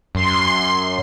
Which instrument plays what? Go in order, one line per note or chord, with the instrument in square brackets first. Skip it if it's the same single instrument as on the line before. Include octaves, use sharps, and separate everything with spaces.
[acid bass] F#2 [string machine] C6